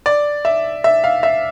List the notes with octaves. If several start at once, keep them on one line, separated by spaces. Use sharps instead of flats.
D5
E5
E5
F5
E5